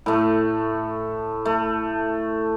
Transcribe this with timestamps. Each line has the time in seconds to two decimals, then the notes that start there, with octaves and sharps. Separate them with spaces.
0.06 A2 A3
1.45 A3